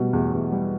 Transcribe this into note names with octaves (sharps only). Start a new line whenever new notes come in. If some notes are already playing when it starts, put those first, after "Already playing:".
Already playing: B2 G3
E2
E2
G3